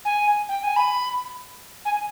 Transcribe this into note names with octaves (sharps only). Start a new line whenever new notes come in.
G#5
G5
G#5
B5
G#5